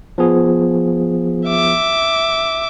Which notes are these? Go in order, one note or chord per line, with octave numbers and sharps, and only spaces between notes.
F3 B3 G#4
E5 D6